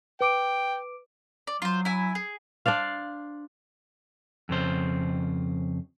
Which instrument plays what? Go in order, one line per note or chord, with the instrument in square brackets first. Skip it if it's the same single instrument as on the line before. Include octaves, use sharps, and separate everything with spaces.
[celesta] B4 D6 D7 [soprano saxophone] G5
[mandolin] D5
[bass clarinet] F#3 [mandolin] F4 C5
[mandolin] E4 G#5
G#4
[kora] D4 C5 D5 F5
[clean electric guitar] F2 C#3 C5